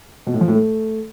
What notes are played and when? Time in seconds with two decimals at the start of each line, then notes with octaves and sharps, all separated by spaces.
0.27 B2
0.34 A2
0.41 F3
0.48 A2
0.55 A3